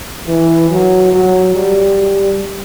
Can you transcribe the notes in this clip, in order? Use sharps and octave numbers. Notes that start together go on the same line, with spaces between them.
E3
F#3
F#3
G3